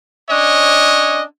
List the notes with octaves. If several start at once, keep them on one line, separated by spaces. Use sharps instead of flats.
C#4 D4 C#5 D#5